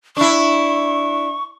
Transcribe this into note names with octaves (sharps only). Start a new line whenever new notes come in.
D4 E4 C#6